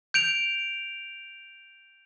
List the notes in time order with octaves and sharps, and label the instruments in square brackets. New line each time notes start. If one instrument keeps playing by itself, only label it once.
[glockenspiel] G6 D7 F7